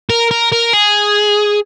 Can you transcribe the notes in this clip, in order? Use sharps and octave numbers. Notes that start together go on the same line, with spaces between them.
A#4
A#4
A#4
G#4